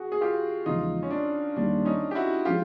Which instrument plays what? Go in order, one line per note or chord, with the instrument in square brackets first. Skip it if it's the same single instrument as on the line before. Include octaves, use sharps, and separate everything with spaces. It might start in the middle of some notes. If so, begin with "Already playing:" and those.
Already playing: [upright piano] F#4 G#4
G#4
F4 G4
[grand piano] E2 C#3 F3 G#3 [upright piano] D#4 F4
[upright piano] C#4
D4
[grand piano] D#2 D#3 G3 [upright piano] D4
[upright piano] C#4 D#4
G4
E4 F#4
[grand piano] F3 G#3 C#4 [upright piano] F4 G4